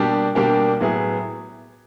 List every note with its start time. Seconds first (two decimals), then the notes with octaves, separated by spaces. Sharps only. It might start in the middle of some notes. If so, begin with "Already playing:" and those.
Already playing: B2 G3 A#3 D4 G4
0.35 B2 G3 A#3 D4 G4
0.80 A2 F#3 B3 E4 G#4